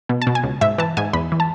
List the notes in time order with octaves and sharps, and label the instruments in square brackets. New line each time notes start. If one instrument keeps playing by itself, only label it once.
[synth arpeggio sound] B2
A5
B2
G#5
C#2
G#2 E5
E3 A5
G#2 G#5
E2 B5
E3
A5